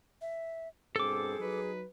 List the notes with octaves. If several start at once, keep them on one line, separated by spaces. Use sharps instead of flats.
E5
G2 B2 C4 G#4 A4 D6
F#3 D#4 B4